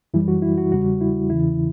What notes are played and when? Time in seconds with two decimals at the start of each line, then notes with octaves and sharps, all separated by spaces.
0.14 F#2 E3 G3 E4
0.28 F#4
0.42 E4
0.57 F#4
0.72 E2 C#3 G3 F#4
1.01 E4
1.30 E2 C#3 E3 E4